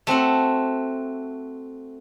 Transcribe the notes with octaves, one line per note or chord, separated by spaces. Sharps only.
A3 C4 F#4 F#5